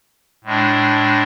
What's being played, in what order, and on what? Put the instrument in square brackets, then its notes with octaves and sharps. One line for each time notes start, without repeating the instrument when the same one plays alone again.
[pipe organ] A2 G#3 D4